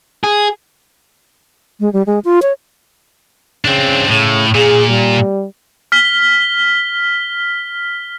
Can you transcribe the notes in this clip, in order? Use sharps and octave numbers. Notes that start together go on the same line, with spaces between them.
G#4
G#3
G3
G#3
F4
C#5
C#3 C4 D4
A2 C#3
A#2 G#4
G3
F6 B6 G7